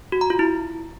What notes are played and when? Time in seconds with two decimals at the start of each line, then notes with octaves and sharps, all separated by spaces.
0.12 F#4
0.21 A#5
0.30 F4
0.39 E4